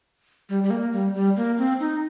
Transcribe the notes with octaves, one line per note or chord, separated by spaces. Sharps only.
G3
G3
A#3
G3
G3
A#3
C4
D#4